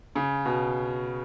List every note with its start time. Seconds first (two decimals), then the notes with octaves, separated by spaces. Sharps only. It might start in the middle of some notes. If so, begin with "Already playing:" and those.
0.15 C#3
0.45 B2